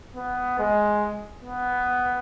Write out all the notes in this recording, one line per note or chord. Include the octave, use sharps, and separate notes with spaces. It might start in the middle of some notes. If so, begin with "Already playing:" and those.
B3
G#3
B3